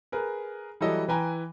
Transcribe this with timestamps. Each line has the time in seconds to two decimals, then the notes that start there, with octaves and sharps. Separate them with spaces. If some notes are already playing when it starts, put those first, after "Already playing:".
0.12 G#4 A#4 B4
0.81 E3 F#3 G3 E4 A4 D#5
1.08 E3 B4 G5 G#5 A#5